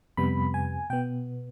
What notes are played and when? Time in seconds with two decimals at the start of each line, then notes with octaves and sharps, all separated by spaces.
0.17 F2 C3 G3 B3 B5
0.54 G#5
0.90 B2 B3 G5